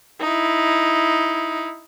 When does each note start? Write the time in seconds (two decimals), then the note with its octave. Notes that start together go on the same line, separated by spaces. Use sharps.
0.21 D#4 E4